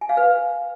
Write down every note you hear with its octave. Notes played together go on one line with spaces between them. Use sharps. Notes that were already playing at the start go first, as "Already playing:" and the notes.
G#5
F5
B4